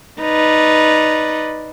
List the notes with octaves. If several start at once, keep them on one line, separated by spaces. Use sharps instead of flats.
D#4 B4 D5